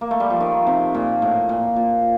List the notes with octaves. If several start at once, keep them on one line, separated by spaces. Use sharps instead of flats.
A#3
A3
G3
F3
D#3
C3
A#2
A2
A#2
A#2